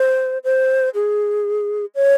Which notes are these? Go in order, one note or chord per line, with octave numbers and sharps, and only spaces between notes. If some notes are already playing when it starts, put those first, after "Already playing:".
Already playing: C5
C5
G#4
C#5